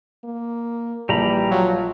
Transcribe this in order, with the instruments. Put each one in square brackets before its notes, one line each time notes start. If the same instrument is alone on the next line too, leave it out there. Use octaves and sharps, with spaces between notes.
[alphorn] A#3
[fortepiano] A#1 [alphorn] E3 [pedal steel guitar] G3 A#5 B5
[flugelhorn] F#3 [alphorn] F4